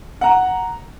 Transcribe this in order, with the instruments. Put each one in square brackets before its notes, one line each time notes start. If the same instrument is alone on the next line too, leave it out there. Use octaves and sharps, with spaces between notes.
[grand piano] F#5 A#5